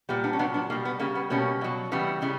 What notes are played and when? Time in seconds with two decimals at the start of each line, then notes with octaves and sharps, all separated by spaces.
0.09 A#2 G3 B3
0.24 B3 D4
0.33 C#4
0.39 A#2 F#3 B3 D4
0.54 B3 D4
0.70 B2 G3 A#3
0.85 B3
0.99 C#3 G3 A#3
1.15 B3
1.30 B2 G3 A#3 C#4
1.61 B2 F#3
1.92 C#3 E3 G3 B3
2.22 C#3 G3